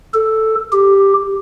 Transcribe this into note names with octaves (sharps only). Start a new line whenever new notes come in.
A4
G4